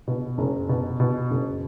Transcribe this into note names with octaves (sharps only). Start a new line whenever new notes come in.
B2
F#1
B2
B2
F#1